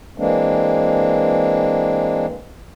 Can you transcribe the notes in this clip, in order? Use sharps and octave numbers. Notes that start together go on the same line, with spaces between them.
E3 G#3 A#3 C4 D4